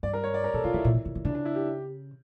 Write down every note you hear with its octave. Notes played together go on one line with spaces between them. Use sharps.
G2 D5
A#4
C#5
D5
A#4
A#2 A4
C#3 F4
D3 E4
A#2
C#3
C#3
D3
C#3 D4
D4
E4
G4